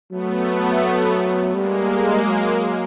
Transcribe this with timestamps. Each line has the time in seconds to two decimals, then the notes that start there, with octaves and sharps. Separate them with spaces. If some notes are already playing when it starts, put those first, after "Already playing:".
0.12 F#3 A3 B3
1.55 G3 G#3 A#3
2.26 F#3